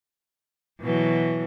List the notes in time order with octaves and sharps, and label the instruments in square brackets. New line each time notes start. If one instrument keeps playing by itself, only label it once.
[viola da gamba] B2 E3 F#3